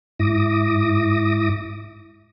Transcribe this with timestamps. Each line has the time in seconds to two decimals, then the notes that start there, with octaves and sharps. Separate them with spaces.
0.19 G#2 E4 D6 D#6 A#6